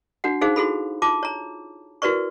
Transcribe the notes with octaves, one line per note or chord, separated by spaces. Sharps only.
D4 F#4 F#5
D#4 G#4 C5 F5
E4 F#4 G#4 A4 B5
F4 A5 D6
C#5 A#5
E4 F#4 A#4 B4 D5 C#6